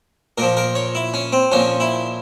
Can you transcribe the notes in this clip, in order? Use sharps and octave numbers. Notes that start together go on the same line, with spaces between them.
A#2 F3 A#4
A#4
C#5
E4
C#4
C4
A#2 F3 C#4
E4